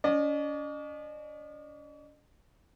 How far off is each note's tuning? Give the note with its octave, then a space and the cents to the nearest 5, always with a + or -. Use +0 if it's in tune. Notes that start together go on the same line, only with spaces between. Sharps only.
C#4 +45 D#5 -45